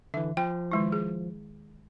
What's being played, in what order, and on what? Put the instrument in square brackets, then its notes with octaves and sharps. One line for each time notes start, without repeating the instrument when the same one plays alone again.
[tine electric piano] D3 E3 [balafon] E5
[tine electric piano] F3 [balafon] G5
[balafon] D#3 G#3 E4
G#4